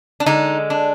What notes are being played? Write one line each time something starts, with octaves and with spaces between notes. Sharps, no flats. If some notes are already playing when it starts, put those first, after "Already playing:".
D4
D3 G#3 D#4
D4